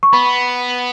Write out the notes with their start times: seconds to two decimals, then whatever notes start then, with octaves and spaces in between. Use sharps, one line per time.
0.03 C#6
0.13 B3 B5